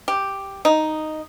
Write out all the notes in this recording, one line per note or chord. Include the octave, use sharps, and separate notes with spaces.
G4
D#4